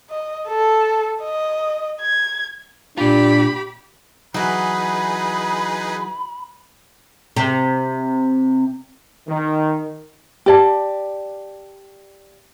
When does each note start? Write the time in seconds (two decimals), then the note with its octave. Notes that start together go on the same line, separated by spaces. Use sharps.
0.10 D#5
0.48 A4
1.22 D#5
2.01 G#6
2.98 A#2 D4 F4 G4 B5
4.34 E3 F#3 D#4 G#4 B4 B5
7.36 C3
9.28 D#3
10.46 G4 D5 A5